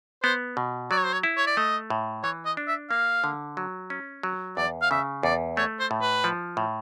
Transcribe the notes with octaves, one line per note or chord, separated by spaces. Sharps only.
B3 C5
B2
F#3 D5
C#5
C5
C#5
E4
C#5
D5
A3 D#5
A2
E3 C#5
D#5
D4
E5
A#3 F5
D3
F#3
C#4
F#3
E2 D5
F5
C#3 E5
E2 D5
A3 C#5
C5
A2
B4
F3
A2